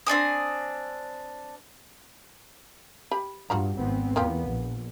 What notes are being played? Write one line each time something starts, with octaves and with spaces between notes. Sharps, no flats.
C4 D4 G#5 D#6
G4 B5
G2 F4 F#4 A#5
G#1 B3 C4
E2 A#3 B3 F4 G4
A#1